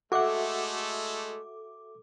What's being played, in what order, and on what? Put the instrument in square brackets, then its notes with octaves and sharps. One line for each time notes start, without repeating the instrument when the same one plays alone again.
[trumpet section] G#3 A3 [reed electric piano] F#4 E5 F#5 [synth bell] A4 D6